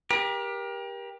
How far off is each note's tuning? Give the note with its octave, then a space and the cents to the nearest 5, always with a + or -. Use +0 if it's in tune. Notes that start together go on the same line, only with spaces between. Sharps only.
G4 +15 A#4 +35